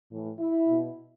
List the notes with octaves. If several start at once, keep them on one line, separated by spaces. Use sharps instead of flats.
A2 E3
E4
B2